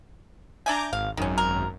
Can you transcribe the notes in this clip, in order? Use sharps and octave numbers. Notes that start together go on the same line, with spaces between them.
D4 E5 G#5 A#5 D6 G6
G#1 F5
G#1 F#2 D#3 C#4
A#4